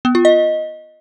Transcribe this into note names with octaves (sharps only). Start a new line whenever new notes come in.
B3
F4
D#5